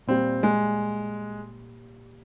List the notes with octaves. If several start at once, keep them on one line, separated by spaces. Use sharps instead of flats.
A#2 G3 C4
G#3